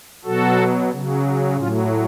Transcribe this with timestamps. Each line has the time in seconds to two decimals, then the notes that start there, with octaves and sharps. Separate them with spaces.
0.24 B2 F#3 F#4 A4
0.91 C#3 F#3
1.57 A2 F#3 C#4 F4